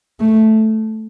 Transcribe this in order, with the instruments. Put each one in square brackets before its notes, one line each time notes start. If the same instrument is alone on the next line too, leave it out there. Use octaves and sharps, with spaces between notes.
[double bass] A3